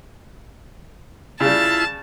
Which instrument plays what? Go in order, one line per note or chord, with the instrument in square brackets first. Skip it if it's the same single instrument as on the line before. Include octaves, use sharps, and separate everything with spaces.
[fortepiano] C#3 G3 [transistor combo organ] E4 F4 [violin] A5